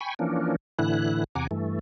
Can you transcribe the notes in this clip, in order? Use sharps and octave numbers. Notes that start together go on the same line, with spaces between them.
G5 G#5 B5 C#6
E3 F3 A#3 C#4 D4
A2 D3 E3 E4 F#6
E2 C3 F#5 G#5 A#5 D6
G2 E3 A3